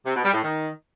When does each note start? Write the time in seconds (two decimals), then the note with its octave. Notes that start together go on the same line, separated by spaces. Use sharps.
0.05 C3
0.15 B2
0.24 G3
0.33 A2
0.43 D#3